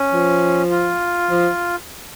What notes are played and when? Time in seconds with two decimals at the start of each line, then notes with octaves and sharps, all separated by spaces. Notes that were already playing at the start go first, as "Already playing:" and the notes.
Already playing: C#4
0.12 F3
0.71 F4
1.28 F3